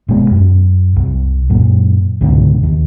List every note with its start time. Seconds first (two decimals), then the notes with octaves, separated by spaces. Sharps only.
0.08 F1 B2 G#3 B3
0.31 F#2
0.96 C2
1.50 F#2 A#2
2.21 C#2 G#2 B2 D3
2.63 D#2